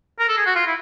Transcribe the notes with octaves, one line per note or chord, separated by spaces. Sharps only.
A#4
A4
G#4
F#4
F4
E4